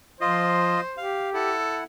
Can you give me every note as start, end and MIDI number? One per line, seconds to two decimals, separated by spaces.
0.21 0.80 53
0.21 0.81 65
0.21 1.04 72
0.21 0.81 75
0.97 1.53 67
0.97 1.30 77
1.34 1.84 64
1.34 1.80 69
1.34 1.84 78